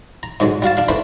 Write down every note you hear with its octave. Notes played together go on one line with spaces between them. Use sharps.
A#5
G#2 D3 F#3 G#3
G3 F#4 F5 A5
D4 F5
E3 A3 D4 B4 C5